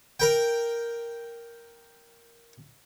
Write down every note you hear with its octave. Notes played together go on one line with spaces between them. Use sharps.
A#4 G5